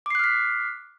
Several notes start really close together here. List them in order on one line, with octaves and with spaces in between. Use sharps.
D6 C7 F#6 F6 B6